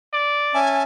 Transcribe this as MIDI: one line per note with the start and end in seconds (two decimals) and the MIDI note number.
0.13 0.59 74
0.54 0.83 61
0.54 0.83 76
0.54 0.82 80
0.54 0.83 81